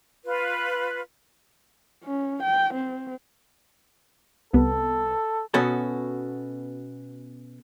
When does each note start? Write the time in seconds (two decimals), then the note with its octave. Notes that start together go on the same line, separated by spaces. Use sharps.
0.24 F4 B4
2.04 C#4
2.43 G5
2.74 C4
4.53 C2 B3 A4
5.54 B2 B3 C#4 F#4 A4